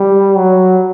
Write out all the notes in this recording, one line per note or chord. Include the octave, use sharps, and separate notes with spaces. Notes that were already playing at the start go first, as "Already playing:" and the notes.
Already playing: G3
F#3